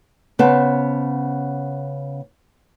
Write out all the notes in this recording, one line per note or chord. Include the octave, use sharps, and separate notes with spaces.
C#3 B3 C5 A5